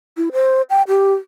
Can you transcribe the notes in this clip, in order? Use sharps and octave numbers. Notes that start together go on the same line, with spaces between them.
E4
C5
G5
G4